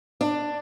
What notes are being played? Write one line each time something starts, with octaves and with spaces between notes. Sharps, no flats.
D4